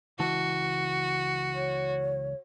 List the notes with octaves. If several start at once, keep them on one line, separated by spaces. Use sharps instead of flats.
C#2 E3 F#4 A5
C#5